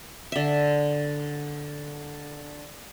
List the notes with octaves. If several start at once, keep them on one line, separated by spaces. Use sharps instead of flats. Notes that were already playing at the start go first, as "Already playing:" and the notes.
D3 E5